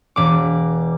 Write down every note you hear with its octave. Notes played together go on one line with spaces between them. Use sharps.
E1 D6